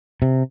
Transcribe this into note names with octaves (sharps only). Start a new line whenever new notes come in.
C3